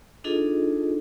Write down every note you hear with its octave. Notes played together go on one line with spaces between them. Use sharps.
D4 D#4 F4 G#4 A4 D#5